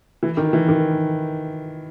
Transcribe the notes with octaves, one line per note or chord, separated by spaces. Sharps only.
E3
D#3
E3
D#3